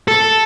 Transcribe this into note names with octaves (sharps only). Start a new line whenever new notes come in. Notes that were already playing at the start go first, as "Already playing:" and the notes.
A4